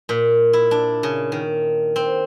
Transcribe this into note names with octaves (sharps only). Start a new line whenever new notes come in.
A#2
E4
D4
C#3
D#3
C4